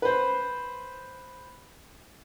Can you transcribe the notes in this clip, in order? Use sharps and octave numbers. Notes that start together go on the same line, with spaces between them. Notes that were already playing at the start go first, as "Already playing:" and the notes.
B4 C5